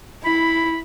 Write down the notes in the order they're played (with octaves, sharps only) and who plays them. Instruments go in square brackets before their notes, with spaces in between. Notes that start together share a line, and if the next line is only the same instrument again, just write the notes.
[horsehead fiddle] E4 [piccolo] B5